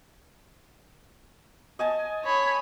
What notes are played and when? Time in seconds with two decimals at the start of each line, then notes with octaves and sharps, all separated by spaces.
1.79 D#5 G#5 A5
2.24 C#5 B5